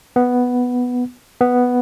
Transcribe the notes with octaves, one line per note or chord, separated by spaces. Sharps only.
B3
B3